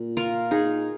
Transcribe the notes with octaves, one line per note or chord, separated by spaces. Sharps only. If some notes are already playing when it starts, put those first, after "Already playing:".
Already playing: A#2
F4 A#4
D#4 G#4